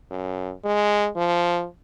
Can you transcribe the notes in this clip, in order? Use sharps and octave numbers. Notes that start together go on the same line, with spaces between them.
F#2
G#3
F3